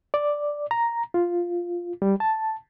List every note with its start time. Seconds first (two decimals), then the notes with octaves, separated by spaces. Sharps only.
0.14 D5
0.71 A#5
1.14 F4
2.02 G3
2.20 A5